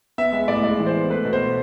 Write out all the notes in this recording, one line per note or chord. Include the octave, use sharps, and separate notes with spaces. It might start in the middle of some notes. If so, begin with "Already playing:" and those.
B3 E5
G#3 E5
A2 D5
G#3 D5
E3
C5
B3
A3 B4
B2
C5